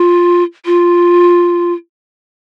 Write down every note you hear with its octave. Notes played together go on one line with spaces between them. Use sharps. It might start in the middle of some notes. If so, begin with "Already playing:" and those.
Already playing: F4
F4